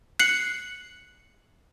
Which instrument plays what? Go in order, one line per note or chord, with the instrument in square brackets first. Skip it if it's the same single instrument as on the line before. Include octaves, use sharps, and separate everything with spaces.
[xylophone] F#6 C7 C#7 F#7